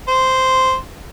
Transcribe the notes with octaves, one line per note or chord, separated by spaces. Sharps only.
C5